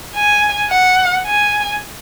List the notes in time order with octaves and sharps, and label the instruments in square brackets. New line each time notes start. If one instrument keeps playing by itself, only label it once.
[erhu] G#5
F#5
G#5